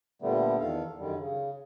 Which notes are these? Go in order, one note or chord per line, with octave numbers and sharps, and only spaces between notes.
A#2 D3 G3 A3 B3
E2 D#3 A4 F5
F#2 D3 D#3 G3
C#3